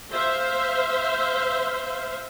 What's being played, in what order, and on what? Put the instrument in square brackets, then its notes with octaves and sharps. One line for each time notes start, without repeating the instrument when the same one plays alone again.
[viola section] C5 E5 F5